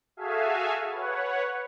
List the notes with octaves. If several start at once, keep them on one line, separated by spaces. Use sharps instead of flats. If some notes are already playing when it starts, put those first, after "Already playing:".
F#4 G#4 A4 E5 F5 G#5
B4 C#5 F#5